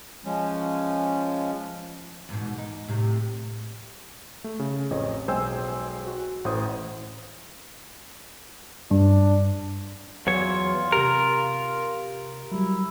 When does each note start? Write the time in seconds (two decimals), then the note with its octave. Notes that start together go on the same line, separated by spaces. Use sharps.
0.25 F3 G#3 C#4
2.29 E2 G#2 B2
2.58 D#4
2.88 A2 C3
4.44 A3
4.59 C#3
4.90 A1 F2 C#5 D#5
5.28 B1 G#3 C5 G5 G#5 E6
6.07 F#4
6.45 A1 A2 C5 D#6
8.91 G2 D4
10.27 E2 F#3 F4 C#5
10.92 C3 G4 A#4
12.52 F#3 G3 E4